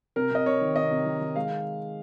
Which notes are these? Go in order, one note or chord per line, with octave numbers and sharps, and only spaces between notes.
C3 A#4
C3 D#5
C3 C#5
D#3
C3 D#5
C3
D#3
D#3
G#3 F5